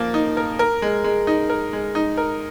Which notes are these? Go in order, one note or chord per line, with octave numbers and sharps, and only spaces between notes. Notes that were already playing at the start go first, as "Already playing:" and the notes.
Already playing: F3 A#3 A#4
D#4
A#4
A#4
G#3
G#3
D#4
A#4
G#3
D#4
A#4